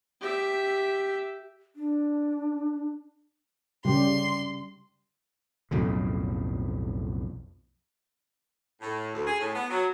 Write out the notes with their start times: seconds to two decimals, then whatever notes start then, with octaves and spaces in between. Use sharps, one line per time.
0.21 G4 E5
1.76 D4
3.85 C#3 G3 G4 C6
5.71 B1 F2 A2 C#3
8.81 A2
9.13 D2
9.27 G#4
9.39 A2
9.54 B3
9.70 F#3